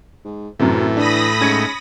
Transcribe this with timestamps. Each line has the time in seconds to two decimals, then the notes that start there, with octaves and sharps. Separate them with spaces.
0.24 G#2
0.60 F#2 A2 C3 E3
0.97 D4 B5 D#6 A#6
1.41 G#2 C#4 G#6 C#7